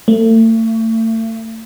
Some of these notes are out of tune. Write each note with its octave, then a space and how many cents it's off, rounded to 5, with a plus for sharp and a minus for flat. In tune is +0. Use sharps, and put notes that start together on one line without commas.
A3 +35